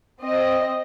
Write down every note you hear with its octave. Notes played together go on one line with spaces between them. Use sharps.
C4 D#5